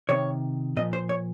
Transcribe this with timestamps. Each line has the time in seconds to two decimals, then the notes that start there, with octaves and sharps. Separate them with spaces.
0.09 C3 D#3 C#5
0.77 A#2 F3 D#5
0.93 C5
1.09 C#5